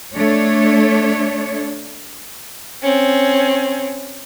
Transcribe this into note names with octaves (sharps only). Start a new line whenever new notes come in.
A3 D4 C#5
C4 C#4